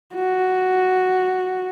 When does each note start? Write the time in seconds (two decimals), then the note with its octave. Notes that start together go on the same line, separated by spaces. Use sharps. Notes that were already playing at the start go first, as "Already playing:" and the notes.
0.15 F#4